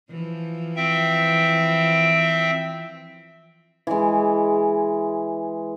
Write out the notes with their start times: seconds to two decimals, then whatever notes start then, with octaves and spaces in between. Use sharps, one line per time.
0.11 E3 F3
0.76 C4 E5 G5
3.87 E3 G#3